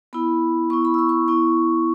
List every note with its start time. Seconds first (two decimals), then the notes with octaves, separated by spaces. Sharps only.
0.13 B3 E4 B5
0.70 B3 E4 C#6
0.85 B5
0.94 E6
0.99 C#6
1.09 C#6
1.28 B3 E4 C#6